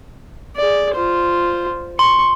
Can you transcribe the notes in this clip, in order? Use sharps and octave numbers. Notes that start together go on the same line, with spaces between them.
G#4 D5
F4 C5
C6 C#6